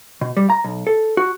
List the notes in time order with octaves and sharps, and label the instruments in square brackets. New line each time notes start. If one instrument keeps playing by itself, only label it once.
[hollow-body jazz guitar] B2
G3
A#5
B1
A4
F#4